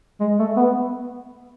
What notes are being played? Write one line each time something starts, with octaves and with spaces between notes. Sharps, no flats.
G#3
A3
B3